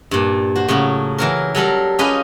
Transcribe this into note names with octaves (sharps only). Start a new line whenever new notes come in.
G2 A#2
F#4 C5
A2 C#3 F#3 F#4
E3 F#3 A#4
F#3 G3 A4 A#4
C#4 F4 G4 G#4 B4 D#5